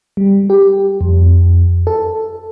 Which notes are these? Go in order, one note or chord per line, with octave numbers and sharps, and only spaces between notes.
G3
G4
F2
A4